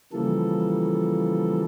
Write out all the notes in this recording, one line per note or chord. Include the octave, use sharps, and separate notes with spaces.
C#3 E3 F3 G3 A#3 A4